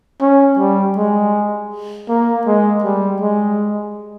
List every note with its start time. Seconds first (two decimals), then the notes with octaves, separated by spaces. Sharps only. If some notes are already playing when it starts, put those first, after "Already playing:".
0.21 C#4
0.59 G3
0.97 G#3
2.09 A#3
2.47 G#3
2.84 G3
3.21 G#3